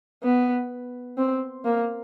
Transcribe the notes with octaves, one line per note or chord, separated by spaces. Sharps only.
B3
C4
A#3